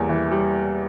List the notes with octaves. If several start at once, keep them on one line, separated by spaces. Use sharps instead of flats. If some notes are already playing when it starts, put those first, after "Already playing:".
Already playing: E2 G3 A#3
E3
G3